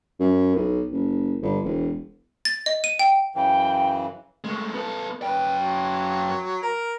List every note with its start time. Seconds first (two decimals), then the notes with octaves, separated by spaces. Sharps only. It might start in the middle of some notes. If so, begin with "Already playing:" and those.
0.20 F#2
0.55 B1
0.92 F#1
1.42 G1
1.64 E1
2.45 A6
2.66 D#5
2.84 D#7
2.99 G5
3.35 F#2 C#3 E3 G5
4.44 G#3 A3
4.74 B3 A4
5.22 F#2 B4 G5
5.59 F#3
6.62 A#4